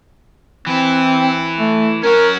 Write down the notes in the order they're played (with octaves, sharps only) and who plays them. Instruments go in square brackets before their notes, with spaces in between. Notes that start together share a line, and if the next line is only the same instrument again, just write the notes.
[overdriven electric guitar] E3 E4 [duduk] C4
[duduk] A3
[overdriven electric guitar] C#4 F#4 [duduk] A#4